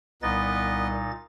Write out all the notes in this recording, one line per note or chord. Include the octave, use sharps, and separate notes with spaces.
C2 A#2 B3 D#4 B4 D#5 A6